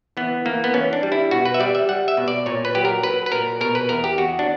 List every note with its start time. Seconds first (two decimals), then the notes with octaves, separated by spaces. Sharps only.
0.17 E3 B3
0.45 E3 A#3
0.64 B3
0.74 E3 C#4
0.93 D4
1.03 G3
1.12 E4
1.31 B2 F#4
1.46 B4
1.54 E5
1.60 G3 D5
1.75 E5
1.89 G3 F#5
2.08 E5
2.17 B2
2.28 D5
2.46 A#2 C#5
2.65 B4
2.75 F#3 G4
2.85 A#4
3.03 F#3 B4
3.26 B4
3.32 A#2 A#4
3.61 B2 A#4
3.75 B4
3.89 E2 A#4
4.04 G4
4.18 E2 F#4
4.39 D4